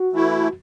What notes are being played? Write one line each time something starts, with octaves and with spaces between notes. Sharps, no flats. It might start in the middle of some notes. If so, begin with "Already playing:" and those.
Already playing: F#4
E3 A3 E4